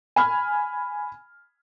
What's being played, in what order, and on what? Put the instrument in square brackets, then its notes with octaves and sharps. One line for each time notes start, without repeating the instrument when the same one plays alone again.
[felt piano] G#5 B5 F6